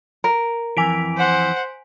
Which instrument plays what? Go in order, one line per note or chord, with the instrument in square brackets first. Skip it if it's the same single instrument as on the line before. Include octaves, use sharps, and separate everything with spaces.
[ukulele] A#4
[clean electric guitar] F2 G#2 E3 [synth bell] G#5 B6 D7
[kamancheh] C5 F#5